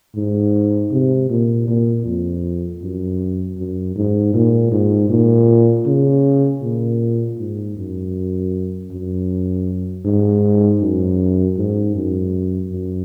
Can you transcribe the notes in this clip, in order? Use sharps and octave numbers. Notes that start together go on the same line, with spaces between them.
G#2
C3
A#2
A#2
F2
F#2
F#2
G#2
A#2
G#2
A#2
C#3
A#2
G#2
F#2
F#2
G#2
F#2
G#2
F#2
F#2